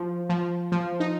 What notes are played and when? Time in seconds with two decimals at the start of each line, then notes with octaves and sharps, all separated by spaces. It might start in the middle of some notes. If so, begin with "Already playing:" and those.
Already playing: F3
0.29 F3
0.72 F3
1.00 D#4